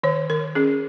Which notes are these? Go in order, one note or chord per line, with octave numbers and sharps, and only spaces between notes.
D#3 C#5
D#3 A#4
C#4 G#4